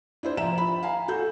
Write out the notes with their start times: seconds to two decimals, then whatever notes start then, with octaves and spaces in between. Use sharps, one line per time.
0.23 D4 E4 C5
0.37 F3 E5 A#5 E7
0.58 B5
0.83 F5 G#5 A#5
1.08 F#4 A4 G6